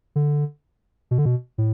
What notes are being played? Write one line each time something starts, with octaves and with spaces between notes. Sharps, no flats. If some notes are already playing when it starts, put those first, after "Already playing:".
D3
B2
D3
B2
A2